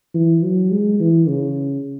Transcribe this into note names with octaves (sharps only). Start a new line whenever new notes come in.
E3
F#3
G#3
E3
C#3